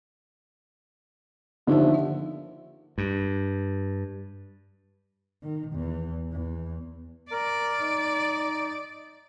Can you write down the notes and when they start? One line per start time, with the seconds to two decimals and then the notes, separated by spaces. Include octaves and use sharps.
1.67 D#2 D3 F3 E5
2.98 G2
5.43 D#3
5.73 E2
6.32 E2
7.32 A#4 D5
7.80 D#4